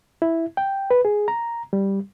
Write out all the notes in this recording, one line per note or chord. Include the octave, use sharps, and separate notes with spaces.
E4
G5
B4
G#4
A#5
G3